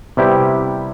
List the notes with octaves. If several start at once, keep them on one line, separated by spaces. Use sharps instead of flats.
C3 G3 B3 E4 G4